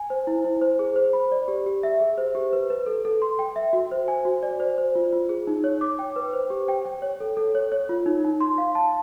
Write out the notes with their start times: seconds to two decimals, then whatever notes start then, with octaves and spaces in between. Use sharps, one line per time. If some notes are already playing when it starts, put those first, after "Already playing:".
Already playing: G#5
0.10 C5
0.27 E4
0.44 E4
0.61 C5
0.79 G#4
0.96 C5
1.13 B5
1.32 D5
1.48 G4
1.66 G4
1.83 E5
2.00 G#4
2.18 C5
2.35 G4
2.53 B4
2.70 B4
2.86 A4
3.05 A4
3.22 C6
3.39 G5
3.56 E5
3.73 F#4
3.91 C5
4.08 G#5
4.25 F#4
4.43 D5
4.60 C5
4.78 C5
4.95 F4
5.13 F4
5.29 G#4
5.47 D#4
5.64 C#5
5.81 D6
5.99 G5
6.16 B4
6.33 C5
6.50 G4
6.68 G5
6.85 G5
7.02 C#5
7.20 A4
7.37 A4
7.55 C#5
7.72 C#5
7.89 F4
8.06 D#4
8.24 D#4
8.41 C6
8.58 F5
8.75 A5